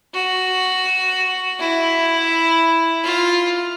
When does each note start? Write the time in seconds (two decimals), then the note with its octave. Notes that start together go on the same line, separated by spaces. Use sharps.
0.14 F#4
1.59 E4
3.03 F4